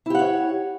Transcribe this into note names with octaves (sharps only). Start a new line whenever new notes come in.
E4 G4 C#5 F#5